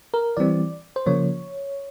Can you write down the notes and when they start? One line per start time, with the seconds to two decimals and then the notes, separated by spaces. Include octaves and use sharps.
0.14 A#4
0.37 E3 G3 C4 D5
0.96 C5
1.06 C#3 F3 A#3 C#5